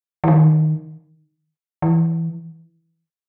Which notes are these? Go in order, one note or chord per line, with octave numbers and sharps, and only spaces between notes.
E3
D#3
E3